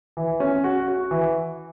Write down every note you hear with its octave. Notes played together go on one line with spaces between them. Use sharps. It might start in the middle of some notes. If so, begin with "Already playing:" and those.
E3
C#4
F#4
F#4
E3